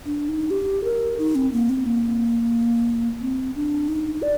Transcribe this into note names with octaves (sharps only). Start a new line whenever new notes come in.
D4
D#4
G4
A#4
D#4
C4
A#3
C4
A#3
C4
D4
D#4
D5